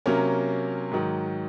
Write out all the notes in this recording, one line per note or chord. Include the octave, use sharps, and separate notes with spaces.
C3 F#3 A#3 C#4 A#4
G#2 D#3 F#3